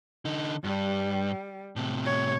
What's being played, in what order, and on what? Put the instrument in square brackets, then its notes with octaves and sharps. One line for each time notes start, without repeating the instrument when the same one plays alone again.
[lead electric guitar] D3 D#4
[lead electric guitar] G2 [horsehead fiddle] G3
[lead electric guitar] A2 C3
[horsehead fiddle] C#5